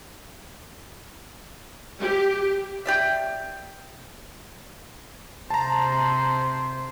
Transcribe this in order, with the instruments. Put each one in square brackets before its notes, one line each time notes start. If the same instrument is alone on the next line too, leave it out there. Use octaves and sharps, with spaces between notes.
[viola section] G4
[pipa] G4 D5 E5
[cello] C3 C5 [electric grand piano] A5 A#5